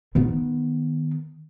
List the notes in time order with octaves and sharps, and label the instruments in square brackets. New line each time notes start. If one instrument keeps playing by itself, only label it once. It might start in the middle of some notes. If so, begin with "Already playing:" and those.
[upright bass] D#3 B3